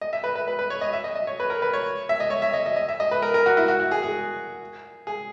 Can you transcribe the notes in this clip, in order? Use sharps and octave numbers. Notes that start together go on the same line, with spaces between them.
D#5
E5
B4
B4
B4
B4
C#5
D#5
E5
D#5
D#5
C#5
B4
A#4
B4
C#5
E5
D#5
C#5
E5
D#5
D#5
D#5
E5
D#5
B4
A#4
A#4
F#4
E4
F#4
F#4
G#4
G#4
G#4